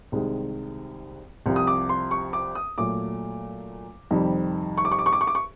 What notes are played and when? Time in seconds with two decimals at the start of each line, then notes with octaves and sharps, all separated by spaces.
0.12 C2 C3 D#3 G#3
1.46 C2 C3 F3
1.56 D#6
1.67 D6
1.89 C6
2.11 C#6
2.33 D6
2.55 D#6
2.78 A#2 F#3 A3 D6
4.11 F2 C3 D#3 G3
4.78 C#6
4.85 D6
4.92 C#6
4.99 D6
5.06 C#6
5.13 D6
5.21 C#6
5.27 D6
5.35 C#6